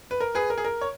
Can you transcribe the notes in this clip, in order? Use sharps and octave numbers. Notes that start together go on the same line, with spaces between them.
B4
A#4
G#4 B4
A#4
G#4
A#4
C#5